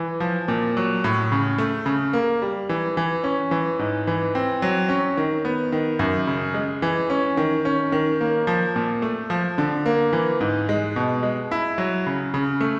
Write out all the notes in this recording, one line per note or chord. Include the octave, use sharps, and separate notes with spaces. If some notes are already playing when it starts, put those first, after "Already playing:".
Already playing: E3
F3
A#2
F#3
A2
C#3
A3
C#3
A#3
G3
E3
E3
C#4
E3
G#2
E3
C4
F#3
C#4
D#3
B3
D#3
F#2
C#3
G#3
E3
C#4
D#3
C#4
D#3
A#3
F3
A#2
A3
F3
D3
A#3
E3
G#2
G#3
B2
G#3
E4
F#3
C#3
C#3
A3